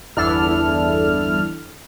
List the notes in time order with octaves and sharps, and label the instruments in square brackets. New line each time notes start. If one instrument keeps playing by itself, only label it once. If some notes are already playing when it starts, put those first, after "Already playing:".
[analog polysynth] G1 E2 D4 E4 A4 F6